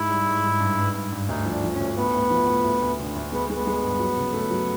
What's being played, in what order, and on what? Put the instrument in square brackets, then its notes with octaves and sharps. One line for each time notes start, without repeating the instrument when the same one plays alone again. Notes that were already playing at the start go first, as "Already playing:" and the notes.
Already playing: [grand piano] G#2 [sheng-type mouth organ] E4
[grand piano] G3
G#2
G#2
G2
G2
G2
G2
[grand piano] D2 [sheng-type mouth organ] D#4
[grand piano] F3
[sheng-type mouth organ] D4
[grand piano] F3
[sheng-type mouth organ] C#4
[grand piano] D2
[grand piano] A2 [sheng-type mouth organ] B3
[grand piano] A2
F3
A2
D2
D2
D3
D2
[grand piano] G#3 [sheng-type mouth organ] B3
[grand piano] G#3
[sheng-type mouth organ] B3
[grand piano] G#3
G2
F#3
C#3
A3
F#3